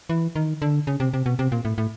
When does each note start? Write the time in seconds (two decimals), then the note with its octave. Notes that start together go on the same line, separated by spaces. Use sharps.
0.09 E3
0.36 D#3
0.62 D3
0.87 C#3
1.00 C3
1.14 C3
1.26 B2
1.39 C3
1.52 A#2
1.65 A2
1.78 A2